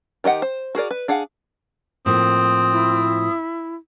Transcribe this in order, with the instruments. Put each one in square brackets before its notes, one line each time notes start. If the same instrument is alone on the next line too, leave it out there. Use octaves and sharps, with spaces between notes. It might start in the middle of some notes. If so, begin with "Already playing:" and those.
[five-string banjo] D#3 G4 D#5 F#5
C5
F#4 G#4 A#4 D5
B4
D4 G#4 F5 F#5
[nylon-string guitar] A2 F3 A#3 [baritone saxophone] C4 [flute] D#6
[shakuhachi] E4